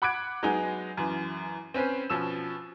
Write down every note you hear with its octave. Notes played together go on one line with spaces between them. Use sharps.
F#5 B5 D6 F#6 G#6 D7
F#3 G#3 B3 D#4 G#4
F#2 E3
C4 C#4 B4 C5
B2 F3 C#4 E6 E7